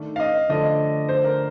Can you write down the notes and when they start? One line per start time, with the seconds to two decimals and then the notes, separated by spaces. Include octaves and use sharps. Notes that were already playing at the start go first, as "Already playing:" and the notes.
Already playing: D#3 A3 D4
0.16 F5
0.20 D#5
0.49 D3 F3 A3 D4 D#5
1.08 C5
1.24 A#4